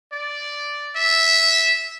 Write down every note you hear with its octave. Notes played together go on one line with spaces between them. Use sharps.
D5
E5